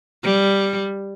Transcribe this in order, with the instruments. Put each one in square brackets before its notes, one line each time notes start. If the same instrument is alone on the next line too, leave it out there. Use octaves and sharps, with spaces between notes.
[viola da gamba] G3